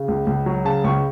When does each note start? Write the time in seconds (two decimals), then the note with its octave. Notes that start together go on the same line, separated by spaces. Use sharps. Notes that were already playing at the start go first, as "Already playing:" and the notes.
Already playing: C#3
0.08 C#2
0.27 C#2
0.46 F#3
0.65 C#3 A5
0.84 C#2 C#6